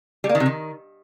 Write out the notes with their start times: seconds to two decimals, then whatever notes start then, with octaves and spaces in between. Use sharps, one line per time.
0.24 G3
0.29 A#3
0.35 D#3
0.40 C3
0.46 D#3